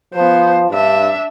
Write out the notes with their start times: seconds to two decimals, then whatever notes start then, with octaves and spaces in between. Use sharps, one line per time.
0.14 F3 B3 C5
0.71 G2 D4 E5